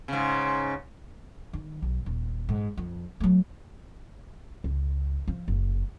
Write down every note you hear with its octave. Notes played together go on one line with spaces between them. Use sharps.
G#2 C#3
D#3
B1
D#1
G#2
F2
F#3 A3
C#2
F3
F#1